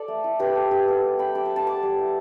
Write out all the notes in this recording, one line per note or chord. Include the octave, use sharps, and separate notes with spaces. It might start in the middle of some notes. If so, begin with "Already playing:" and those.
Already playing: A4 D5
A3
E4
D4 G4 B4
D4 A4
B3 G4
B3 A4
G3
G3 G5 B5
G3 A5 D6
A5 D6
D4
A5 D6
G3 A5 D6
G3
E4